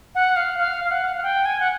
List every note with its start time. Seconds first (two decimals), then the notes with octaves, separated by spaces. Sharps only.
0.15 F#5
0.36 F5
0.58 F5
0.84 F5
0.91 F#5
1.17 F#5
1.23 G5
1.45 G#5
1.60 F#5